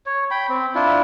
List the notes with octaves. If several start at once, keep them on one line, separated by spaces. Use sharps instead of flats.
C#5
G5 B5
C4
D4 E4 F4